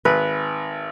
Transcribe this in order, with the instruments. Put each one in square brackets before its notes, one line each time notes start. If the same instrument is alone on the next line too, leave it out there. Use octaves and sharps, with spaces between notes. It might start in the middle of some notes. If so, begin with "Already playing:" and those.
[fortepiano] G#1 [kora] B4